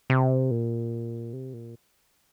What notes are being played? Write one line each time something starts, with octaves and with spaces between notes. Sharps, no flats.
C3
A#2
C3
A#2